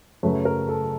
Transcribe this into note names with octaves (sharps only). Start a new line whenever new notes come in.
F#2 C#3 F#3 A3 B4
A#4
A4